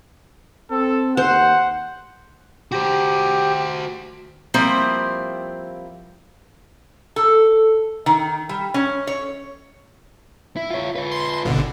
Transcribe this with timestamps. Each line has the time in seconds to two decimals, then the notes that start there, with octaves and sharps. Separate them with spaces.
0.70 C4 A4
1.17 D#2 C5 F#5
2.72 F#4 G4 C5
4.54 F3 G3 A#3 C4 E4 C5
7.16 A4
8.06 D#3
8.49 G3
8.74 C#4
9.07 C#5
10.56 E4
10.71 F4 C#5
10.95 F4 B4
11.12 C6
11.45 G1 B2 D3